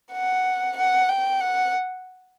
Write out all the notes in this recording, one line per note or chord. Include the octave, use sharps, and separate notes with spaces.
F#5
F#5
G5
F#5